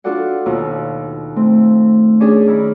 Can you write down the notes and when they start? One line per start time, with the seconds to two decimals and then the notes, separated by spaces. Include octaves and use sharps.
0.04 D4 F4 F#4 A4 D5 F#5
0.46 D#2 B2 D#4 F4
1.36 A3 C4
2.20 C#4 D4 G#4
2.48 D#3 E4 B5